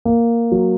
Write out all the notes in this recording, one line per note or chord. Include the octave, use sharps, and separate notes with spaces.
A#3
F#3